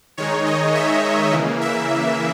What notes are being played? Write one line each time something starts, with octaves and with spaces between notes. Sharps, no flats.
D#3 G#3 D#4 C#5
D#5
E5
C#3 E3 A#3
E5